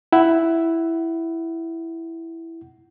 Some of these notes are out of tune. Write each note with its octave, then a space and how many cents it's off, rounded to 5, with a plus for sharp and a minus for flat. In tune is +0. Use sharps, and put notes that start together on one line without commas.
E4 +0 F#5 +20